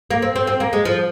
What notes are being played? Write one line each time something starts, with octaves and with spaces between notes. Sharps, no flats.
A#3
C4
C4
C4
A#3
G#3
F3